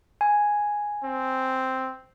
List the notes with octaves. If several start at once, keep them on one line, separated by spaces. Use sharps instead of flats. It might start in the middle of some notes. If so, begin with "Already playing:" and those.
G#5
C4